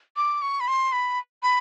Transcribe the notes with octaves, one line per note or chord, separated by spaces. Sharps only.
D6
C#6
B5
C6
B5
B5